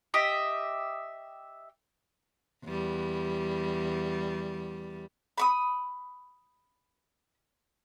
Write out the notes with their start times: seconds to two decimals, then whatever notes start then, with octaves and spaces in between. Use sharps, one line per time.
0.14 G4 D#5 E5
2.65 E2 G3
5.38 B5 C#6 D#6